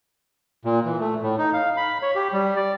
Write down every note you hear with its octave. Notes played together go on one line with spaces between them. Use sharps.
A#2
E3
A3
A2
D#4
F5
B5
C#5
G4
G3
D5